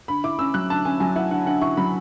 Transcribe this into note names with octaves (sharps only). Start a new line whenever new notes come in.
D3 B5
E4 D6
C#4 E6
F#3 F#6
D3 A5
C#4 G#5
F#3 G#5
E4 F#5
D3 F#5
D3 F#5
E4 C#6
F#3 B5